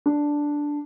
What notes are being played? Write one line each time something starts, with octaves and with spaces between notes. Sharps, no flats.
D4